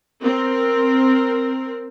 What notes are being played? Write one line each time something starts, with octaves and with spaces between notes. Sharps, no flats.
C4 A#4